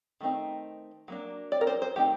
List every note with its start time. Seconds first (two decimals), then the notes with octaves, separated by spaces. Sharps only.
0.21 D#3 A3 C4 D#4
1.08 F#3 A#3 D4
1.52 D5
1.61 A#4
1.67 C5
1.82 C5
1.96 D#3 A3 C4 D#4 G4